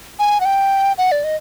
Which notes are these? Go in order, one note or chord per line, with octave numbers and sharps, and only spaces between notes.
G#5
F#5
G5
F#5
D5
D#5